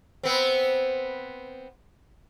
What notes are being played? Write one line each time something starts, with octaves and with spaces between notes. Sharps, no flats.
B3 C4